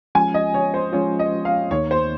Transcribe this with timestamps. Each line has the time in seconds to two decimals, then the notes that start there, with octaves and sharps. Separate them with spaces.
0.15 F3 G#3 C#4 F4 G#5
0.34 D#5
0.54 C#5
0.74 C5
0.93 F3 G#3 C#4 F4 C#5
1.19 D#5
1.45 F5
1.71 D#2 D#3 A#3 D#4 C#5
1.91 C5